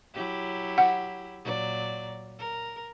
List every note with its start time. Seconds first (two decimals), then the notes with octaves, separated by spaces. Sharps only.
0.14 F#3 E4 G4
0.78 F#5
1.44 A#2 F#3 D5
2.39 A#4